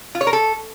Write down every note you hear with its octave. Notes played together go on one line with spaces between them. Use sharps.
F4
C#5
A#4
A4